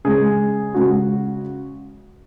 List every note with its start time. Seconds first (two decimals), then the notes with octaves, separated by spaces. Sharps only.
0.05 C#3 G#3 G#4
0.74 C#3 G#3 F#4